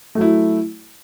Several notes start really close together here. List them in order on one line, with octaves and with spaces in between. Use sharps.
A3 F#3 E4